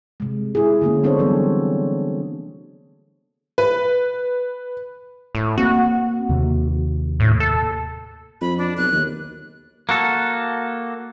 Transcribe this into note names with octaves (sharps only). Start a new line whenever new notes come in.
C3 G#3
E4 G#4
D3 A3 A#3 C#4 E4
B3 C4 D4 A4 C5 C#5
E3 F#3 G3 A3 A#3 C4
B4
A2
A#3 C4 F#4
D#2 C3 A#3
A2
A4
F2 B5
D4
B1 F#6
D#2
A#3 F#4 A4